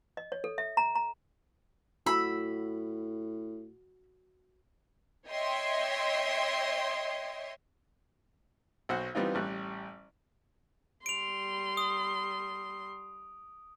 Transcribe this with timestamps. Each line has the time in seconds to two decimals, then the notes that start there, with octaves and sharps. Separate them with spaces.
0.17 D#5
0.32 C#5
0.44 A4
0.58 E5
0.77 A#5
0.95 A#5
2.06 A2 F#4 B5 E6
5.29 C#5 D#5 E5 G5 C6
8.89 B1 F#4 C5 F#5
9.15 E3 G3 B3 C4 D#4 F4
9.35 A1 G3 F#6
11.06 G3 C6 D7 F7
11.77 D#6